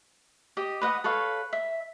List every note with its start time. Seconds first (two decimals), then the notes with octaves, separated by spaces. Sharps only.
0.57 G4 D#5
0.81 B4 D#5 F#5
1.04 A4 B4 C#5 F5
1.53 E5